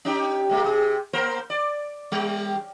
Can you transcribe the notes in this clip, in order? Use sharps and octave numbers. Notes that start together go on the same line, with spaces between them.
C#4 D#4 G4
C3 G#3 A#3
C3 G#4
A#3 A#4 C5
D5
G3